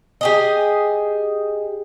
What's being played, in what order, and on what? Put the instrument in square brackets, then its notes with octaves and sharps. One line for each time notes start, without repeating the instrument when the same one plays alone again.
[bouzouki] G4 G#4 D#5